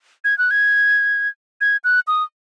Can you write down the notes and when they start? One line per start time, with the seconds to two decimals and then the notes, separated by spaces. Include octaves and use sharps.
0.24 G#6
0.38 F#6
0.51 G#6
1.61 G#6
1.84 F#6
2.07 D#6